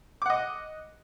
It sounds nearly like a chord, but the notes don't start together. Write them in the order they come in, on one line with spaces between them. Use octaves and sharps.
D6 F#5 D#5